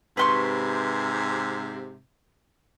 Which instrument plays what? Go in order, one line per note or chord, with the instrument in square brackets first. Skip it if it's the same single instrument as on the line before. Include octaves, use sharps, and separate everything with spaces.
[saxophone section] G#2 C3 [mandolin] B4 C6 C#6